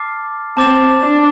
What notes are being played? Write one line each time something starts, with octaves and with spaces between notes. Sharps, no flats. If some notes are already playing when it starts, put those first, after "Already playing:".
Already playing: A5 D6 F6 A6 C7
C4 A5 D6 A6 E7
D4